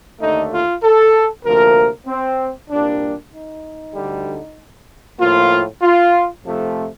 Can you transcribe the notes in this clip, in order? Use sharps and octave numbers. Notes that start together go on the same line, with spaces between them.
D#2 D3 A3 D#4
F4
A4
D2 C3 F3 A#3 A#4
C4
C2 A#2 G3 A#3 D4
D#4
D2 D3 G3
A2 F3 A#3 F4
F4
F2 C3 F3 A3